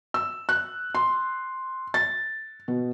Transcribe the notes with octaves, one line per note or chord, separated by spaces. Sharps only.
E6
F#6
C6
A6
B2